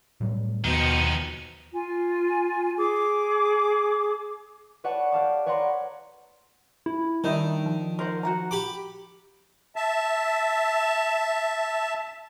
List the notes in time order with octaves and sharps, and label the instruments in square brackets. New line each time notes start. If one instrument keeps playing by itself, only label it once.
[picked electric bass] A2 F#3 G3
[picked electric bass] D#2 [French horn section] B2 [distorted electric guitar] D#3 F3 [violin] C#7 D#7
[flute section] F4 G#5
G#4 D6
[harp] B4 C#5 D5 F#5 A5 C#6
G4 F5 A5 D6
B4 C#5 D5 F#5 A#5 C6
[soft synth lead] E4
[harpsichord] D#3 [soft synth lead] G3 [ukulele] D4 D#4 E5
[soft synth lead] F3
[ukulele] A#4 C5 F#5
F#4 F#5 A#5
[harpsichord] G4 B5 D6
[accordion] E5 A5